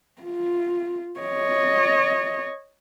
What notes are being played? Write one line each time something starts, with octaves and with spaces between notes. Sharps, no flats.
F4
C#5 D#5